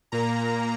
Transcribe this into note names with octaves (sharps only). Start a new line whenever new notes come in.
A#2 A#3 A#5